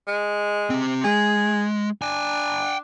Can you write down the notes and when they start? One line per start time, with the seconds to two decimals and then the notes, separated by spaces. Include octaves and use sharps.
0.07 G#3
0.70 C4 G4
1.04 G#3 G#4
2.02 D4 G5 G#5